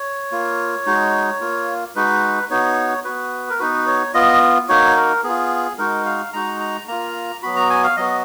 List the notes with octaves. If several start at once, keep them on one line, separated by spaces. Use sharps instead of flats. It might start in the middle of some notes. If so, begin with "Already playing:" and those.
Already playing: C#5
A#3 F4
G#3 D#4 F#4
A#3 F4
G#3 D#4 F#4 B4
B3 D#4 F#4 C#5
B3 F#4 B4
A#4
B3 D#4 F#4 B4
C#5
B3 F4 D#5
A#3 D#4 F#4 C#5
A#4
B3 F4 G#4
G#3 D#4 F#4 A#4
F5
G#3 D#4 F#4 A#5
A#5
A#3 F4 A#5
F#3 B3 F#4 B5
A#5
G#5
F5
F#3 B3 F#4 D#5